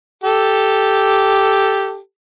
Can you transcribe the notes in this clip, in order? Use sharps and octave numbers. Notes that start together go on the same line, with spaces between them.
G4 A4